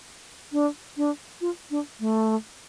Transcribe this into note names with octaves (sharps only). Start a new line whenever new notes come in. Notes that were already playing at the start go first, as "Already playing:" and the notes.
D4
D4
F4
D4
A3